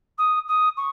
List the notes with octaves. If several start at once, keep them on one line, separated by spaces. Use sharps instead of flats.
D#6
D#6
C#6